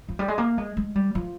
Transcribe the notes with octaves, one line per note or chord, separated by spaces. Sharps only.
F3
G3
G#3
A#3
G#3
G#3
G3
F3